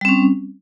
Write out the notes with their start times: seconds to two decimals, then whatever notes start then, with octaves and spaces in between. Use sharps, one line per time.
0.01 G3
0.05 C4
0.09 C#4